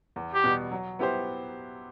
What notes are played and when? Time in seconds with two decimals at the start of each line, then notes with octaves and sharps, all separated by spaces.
0.16 E2
0.35 G4
0.44 B2 G3 B3
0.72 F#3
0.99 B3 E4 G4 C5